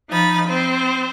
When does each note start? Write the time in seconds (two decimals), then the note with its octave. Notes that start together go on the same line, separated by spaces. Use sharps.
0.10 F3 D#4 B5 A6
0.48 C4 C5